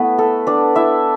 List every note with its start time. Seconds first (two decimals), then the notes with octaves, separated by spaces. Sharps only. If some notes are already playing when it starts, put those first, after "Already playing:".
Already playing: A3 B3 E4 B4
0.18 A4
0.47 D4 D5
0.76 E4 E5